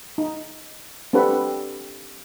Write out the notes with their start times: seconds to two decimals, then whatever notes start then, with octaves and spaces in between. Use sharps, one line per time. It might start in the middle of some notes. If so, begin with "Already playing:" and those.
0.18 D#4
1.13 C4 D4 G4 A4 B4 F#5